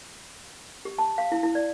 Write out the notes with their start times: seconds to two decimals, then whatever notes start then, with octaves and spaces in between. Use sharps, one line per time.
0.85 G4
0.98 A5
1.18 F5
1.32 E4
1.43 E4
1.55 D5